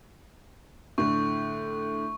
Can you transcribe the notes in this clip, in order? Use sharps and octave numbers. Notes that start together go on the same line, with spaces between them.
A2 D3 C#6